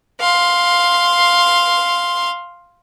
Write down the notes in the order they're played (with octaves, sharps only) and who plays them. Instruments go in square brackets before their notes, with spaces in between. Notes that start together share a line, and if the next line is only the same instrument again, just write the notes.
[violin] F5 C6